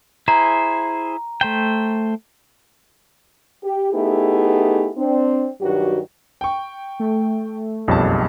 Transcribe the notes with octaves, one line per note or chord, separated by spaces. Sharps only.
E4 G#4 C5 A#5
A3 C5 G5
G4
A3 B3 D#4 E4 G4 G#4
C4 D4
G2 D#3 F#3 F#4 G4
G5 C#6
A3
F#1 B1 F2 G3 A5